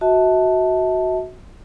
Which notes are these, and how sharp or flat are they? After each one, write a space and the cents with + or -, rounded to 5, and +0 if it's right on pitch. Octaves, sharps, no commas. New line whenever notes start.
F#4 +0 E5 -40 A5 +0